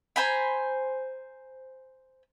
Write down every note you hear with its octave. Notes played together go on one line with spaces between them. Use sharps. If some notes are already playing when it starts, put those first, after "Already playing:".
C5 G#5 A#5 B5